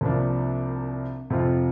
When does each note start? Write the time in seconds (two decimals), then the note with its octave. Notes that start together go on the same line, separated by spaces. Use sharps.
0.01 C2 C3 F3 A#3 D4
1.30 F2 C3 F3 C4 F4